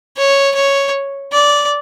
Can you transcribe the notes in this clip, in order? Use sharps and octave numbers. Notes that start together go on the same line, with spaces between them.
C#5
C#5
D5